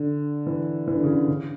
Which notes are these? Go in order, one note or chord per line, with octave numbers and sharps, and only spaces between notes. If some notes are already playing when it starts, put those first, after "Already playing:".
Already playing: D3
E3
E3
D3
C#3
D3
C#3